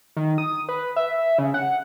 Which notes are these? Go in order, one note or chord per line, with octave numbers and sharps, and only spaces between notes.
D#3
D#6
B4
E5
C#3
F#5